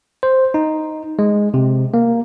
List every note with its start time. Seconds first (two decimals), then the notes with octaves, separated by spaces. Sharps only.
0.23 C5
0.54 D#4
1.19 G#3
1.54 C3
1.94 A#3